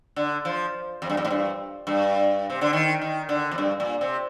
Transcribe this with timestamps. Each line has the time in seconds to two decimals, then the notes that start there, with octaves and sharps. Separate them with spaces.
0.16 D3
0.45 F3
1.02 F2
1.10 G2
1.17 F2
1.25 A2
1.30 G2
1.87 G2
2.50 C3
2.61 D3
2.73 D#3
3.02 D#3
3.29 D3
3.51 F2
3.58 G2
3.80 A#2
4.01 C3